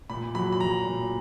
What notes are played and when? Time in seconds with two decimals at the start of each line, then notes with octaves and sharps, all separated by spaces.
0.10 A#2 B5
0.35 F#3 B5
0.52 B5
0.60 F#3 A#5
0.86 A#2